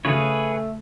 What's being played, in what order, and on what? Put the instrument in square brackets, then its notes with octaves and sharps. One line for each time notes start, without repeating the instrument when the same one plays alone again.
[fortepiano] C#3 [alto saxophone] A3 [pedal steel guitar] G#4 B4 C#5